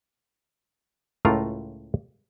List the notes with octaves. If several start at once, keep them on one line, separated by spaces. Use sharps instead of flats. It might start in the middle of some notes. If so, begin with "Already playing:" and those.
C#2 A2 A3 F4 A#4 A#5